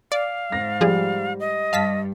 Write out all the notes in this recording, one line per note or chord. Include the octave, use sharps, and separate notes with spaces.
D5 F5
G#2 A#6
F3 G3 G#4
D#5
G2 F5 A5 B6